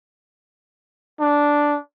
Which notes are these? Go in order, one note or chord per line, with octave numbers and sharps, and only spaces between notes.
D4